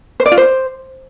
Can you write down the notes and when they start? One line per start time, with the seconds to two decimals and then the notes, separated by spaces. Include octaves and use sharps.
0.20 C5
0.26 D5
0.32 F4
0.38 C5